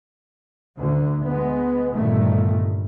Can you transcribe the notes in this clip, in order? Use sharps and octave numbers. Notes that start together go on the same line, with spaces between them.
D2 D3
G#3 B3
G1 G2 A#2 D#3 A3